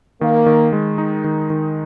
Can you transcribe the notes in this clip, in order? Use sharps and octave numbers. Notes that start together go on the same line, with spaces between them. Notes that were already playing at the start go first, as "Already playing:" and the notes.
D#3 A#3
D#3
G#3
D#4
D#3
D#3